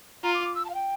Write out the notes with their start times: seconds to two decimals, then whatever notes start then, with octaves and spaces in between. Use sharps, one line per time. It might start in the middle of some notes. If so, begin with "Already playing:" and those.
0.23 F4 A#5
0.34 D6
0.45 D6
0.55 E6
0.65 A5
0.70 F5
0.74 G5